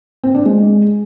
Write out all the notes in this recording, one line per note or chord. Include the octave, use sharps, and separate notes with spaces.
C4
D4
G#3